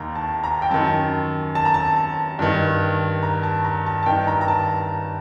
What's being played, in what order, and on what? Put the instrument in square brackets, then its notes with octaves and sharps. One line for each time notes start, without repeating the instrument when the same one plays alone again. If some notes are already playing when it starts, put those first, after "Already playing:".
Already playing: [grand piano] D#2 D#3 A#5
A5
A#5
G5
F#2 D#3 A5
A5
A#5
A5
G2 D#3
A#5
A5
A#5
A5
A5
G2 D#3 G5
A#5
A#5
A5